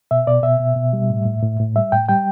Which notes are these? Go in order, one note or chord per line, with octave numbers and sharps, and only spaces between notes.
B2 E5
B2 D5
B2 E5
B2
B2
G3
A2
A2
A2
A2
G3 E5
A2 G5
G3 G5